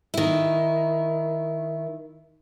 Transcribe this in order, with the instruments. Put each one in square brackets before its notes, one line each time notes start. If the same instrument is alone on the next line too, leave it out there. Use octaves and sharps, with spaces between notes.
[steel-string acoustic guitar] D#3 E4